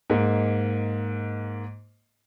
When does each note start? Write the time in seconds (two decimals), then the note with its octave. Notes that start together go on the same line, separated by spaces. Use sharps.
0.10 G#2 A#3